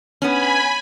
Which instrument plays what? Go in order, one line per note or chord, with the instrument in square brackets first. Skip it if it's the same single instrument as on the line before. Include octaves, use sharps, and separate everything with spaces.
[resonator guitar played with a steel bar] B3 C#4 [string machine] G#5 B5